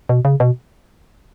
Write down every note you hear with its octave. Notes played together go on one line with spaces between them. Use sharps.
B2
C#3
B2